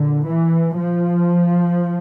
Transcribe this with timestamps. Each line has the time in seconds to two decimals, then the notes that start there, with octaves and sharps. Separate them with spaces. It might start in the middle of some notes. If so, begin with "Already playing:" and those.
Already playing: A#2 D3
0.26 E3
0.76 F3